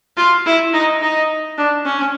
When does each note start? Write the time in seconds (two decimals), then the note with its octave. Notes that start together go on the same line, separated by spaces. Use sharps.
0.17 F4
0.46 E4
0.73 D#4
1.02 D#4
1.58 D4
1.85 C#4